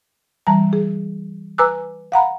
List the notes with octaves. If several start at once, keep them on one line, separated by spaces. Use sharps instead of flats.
E3 G3 A5 A#5
G#4
B4 G#5 A#5 D6 E6 F#6
F5 F#5 A#5 B5